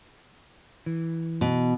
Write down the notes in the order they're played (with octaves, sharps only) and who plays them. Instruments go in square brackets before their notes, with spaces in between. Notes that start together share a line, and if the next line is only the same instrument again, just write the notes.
[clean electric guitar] E3
[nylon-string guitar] B2